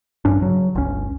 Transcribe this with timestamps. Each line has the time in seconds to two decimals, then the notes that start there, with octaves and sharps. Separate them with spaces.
0.25 A1 G2 C#4 D4
0.42 C#3 F#3
0.75 G1 C#2 C#4